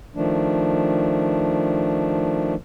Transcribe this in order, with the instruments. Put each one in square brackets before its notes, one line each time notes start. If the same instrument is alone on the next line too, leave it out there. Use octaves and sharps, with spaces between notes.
[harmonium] D#3 F3 A3 D4